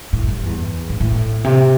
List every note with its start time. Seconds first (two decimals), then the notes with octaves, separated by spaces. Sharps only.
0.13 A2
0.29 G2
0.45 E2
0.90 A2
1.00 A2
1.44 C3